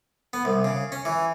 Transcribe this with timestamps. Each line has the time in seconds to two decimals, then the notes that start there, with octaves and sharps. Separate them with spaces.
0.33 B3
0.45 C2
0.64 C#3
0.92 C#4
1.05 E3